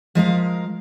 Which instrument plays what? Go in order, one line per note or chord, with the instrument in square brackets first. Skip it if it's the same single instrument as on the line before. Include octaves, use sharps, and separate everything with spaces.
[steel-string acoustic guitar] F3 G#3 A#4 F5